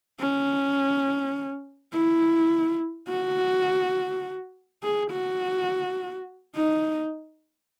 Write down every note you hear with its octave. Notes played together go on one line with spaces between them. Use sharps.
C#4
E4
F#4
G#4
F#4
D#4